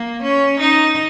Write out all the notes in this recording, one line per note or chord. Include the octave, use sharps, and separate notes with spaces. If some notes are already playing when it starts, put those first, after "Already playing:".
Already playing: A#3
C#4
D#4